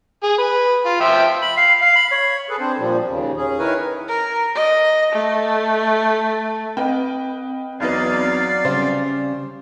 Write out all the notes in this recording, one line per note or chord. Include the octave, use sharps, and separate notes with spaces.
G#4
B4
F4
F3 E5 G5
B5
F5
F5
B5
C#5
G#4 A4 B4
C4 D4 C5
A#2 F3 G3
D#2 C#3
C#4 G#4
D#3 E4 A#4 B4 C#5 G#5
A#4
D#5
A3
C4 B4 D#5 G5
E2 F#3 D#4 B4 D5 F5
C#3 G3 C5